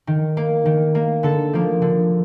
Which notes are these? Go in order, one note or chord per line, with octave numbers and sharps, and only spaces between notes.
D#3
A#3
D#3
A#3
D3 A4 A5
F3 A#3
D3